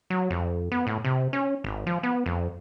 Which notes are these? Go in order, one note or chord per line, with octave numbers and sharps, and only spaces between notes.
F#3
F2
B3
A2
C3
C#4
G#1
F3
B3
F2